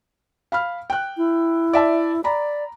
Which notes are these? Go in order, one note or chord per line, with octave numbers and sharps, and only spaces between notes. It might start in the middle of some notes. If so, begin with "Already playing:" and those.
F5 B5 F6
G5 F#6
E4
D5 E5 A5
D5 A#5 B5